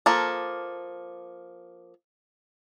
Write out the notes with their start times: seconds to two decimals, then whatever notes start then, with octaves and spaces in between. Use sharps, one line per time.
0.06 F3 A#3 A4